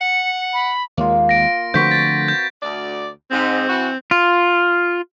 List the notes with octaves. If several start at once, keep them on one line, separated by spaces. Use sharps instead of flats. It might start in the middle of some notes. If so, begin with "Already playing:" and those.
F#5 C#7
B5
D#2 G#3 A#3 F4
A#6 D7
D3 F3 A3 C4 F#4 B4 G6 B6
A6
G6
D2 D5
G#2 C4
E3 F#4
F4